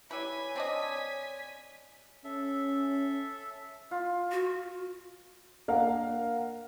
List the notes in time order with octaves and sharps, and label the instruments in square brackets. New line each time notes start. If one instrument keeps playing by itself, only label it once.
[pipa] G3 E4 B4 [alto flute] C#5 [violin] G#5 B6
[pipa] C4 D4 D#5
[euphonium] C#4 [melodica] A4 E5
[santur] F4
[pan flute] F#4
[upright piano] A#3 D4 A#4 F5 F#5